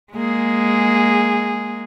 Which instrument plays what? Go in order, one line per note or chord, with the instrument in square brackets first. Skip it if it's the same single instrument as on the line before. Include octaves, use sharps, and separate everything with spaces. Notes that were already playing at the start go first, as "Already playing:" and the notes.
[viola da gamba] G#3 A#3 G#4